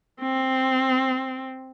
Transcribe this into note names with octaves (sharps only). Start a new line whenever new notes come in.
C4